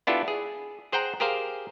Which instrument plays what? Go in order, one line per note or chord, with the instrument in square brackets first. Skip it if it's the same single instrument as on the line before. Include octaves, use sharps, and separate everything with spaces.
[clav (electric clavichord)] B3 D4 E4 F4 G4 A4
G#4
G#4 C5 F#5 G5 A#5
G4 G#4 A#4 C5 F5